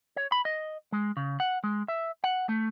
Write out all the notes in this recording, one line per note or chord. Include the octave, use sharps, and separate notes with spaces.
C#5
B5
D#5
G#3
C#3
F#5
G#3
E5
F#5
A3